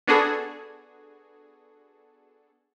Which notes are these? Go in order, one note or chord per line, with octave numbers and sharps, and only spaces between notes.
B3 D4 F#4 G#4 A4